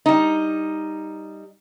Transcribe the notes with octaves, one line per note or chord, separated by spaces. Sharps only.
G3 D#4